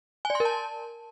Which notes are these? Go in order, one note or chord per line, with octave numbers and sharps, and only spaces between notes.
G#5
D5
C6
A#4
A5